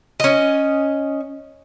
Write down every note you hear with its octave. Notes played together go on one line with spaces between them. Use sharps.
C#4 D#5